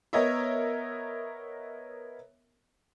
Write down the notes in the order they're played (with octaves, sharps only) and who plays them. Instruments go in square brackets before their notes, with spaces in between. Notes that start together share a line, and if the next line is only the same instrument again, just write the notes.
[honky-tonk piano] B3 A#4 C#5 D#5 E5